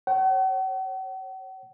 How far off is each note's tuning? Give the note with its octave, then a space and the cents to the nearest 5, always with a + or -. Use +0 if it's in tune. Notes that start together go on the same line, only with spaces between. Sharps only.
C#5 -15 F#5 +45